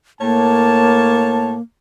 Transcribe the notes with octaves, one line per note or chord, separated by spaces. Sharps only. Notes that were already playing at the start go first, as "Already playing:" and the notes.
A2 A#3 C#5 A5